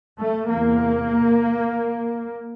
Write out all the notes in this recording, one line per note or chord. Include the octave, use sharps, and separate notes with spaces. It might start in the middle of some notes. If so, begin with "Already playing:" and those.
A3
E2 C3 A#3